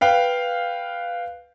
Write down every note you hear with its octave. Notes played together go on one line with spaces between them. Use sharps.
B4 F5 G5